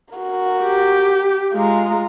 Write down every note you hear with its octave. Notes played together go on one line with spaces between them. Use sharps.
F#4 A#4
G4
G#3 F4 A#5